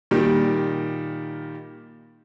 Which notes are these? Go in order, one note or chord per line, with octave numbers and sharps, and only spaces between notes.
A#2 D#3 G3